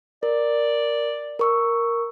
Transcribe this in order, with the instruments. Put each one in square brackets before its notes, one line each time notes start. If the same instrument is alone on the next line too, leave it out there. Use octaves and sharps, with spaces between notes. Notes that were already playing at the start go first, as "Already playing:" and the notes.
[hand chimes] A#4 [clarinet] D5
[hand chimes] A#4 C#6 E6